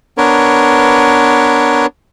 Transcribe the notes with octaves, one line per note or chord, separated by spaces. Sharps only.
B3 D4 A#4 B4 C#5